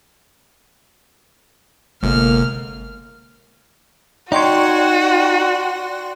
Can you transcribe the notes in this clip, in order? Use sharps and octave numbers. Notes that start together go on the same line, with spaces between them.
G1 C3 G#3 A#3 F6
D#4 F#4 C#5 D5 G5 C6